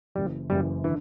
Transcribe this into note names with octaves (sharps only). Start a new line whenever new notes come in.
F#1 F#2 E3 G3
F#1 F#2 E3 G3
D3 E3